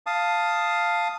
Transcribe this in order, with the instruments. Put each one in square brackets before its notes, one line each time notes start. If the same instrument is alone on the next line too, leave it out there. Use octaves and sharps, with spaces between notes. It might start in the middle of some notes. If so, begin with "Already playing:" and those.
[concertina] F5 A5 D#6